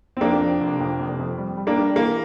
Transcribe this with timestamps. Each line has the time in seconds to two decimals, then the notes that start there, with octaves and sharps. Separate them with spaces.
0.17 C4
0.21 F2 A#3 D4
0.41 F2
0.61 F1
0.80 F2
1.00 F1
1.19 F2
1.38 G3
1.57 G3
1.67 A#3 D4
1.78 G3
1.96 E3 A#3